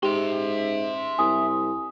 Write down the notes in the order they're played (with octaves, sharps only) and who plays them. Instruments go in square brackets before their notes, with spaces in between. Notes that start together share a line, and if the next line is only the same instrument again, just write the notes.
[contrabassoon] G#2 [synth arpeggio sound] G4 [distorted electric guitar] E5 C6
[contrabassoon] C2 [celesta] G#5 D#6